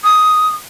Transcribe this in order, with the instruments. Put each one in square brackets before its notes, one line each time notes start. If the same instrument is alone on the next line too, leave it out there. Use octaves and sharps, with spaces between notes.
[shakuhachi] D#6